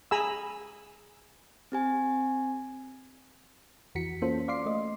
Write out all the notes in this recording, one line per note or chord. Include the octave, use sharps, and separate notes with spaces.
G#4 G#5 A#5 B5 E6
C4 G4 G#5
F2 E3 F#4 B6 C#7
A#3 C#4 F4 A4 C5
D5 F5 C6 D6 C7
A3 D#5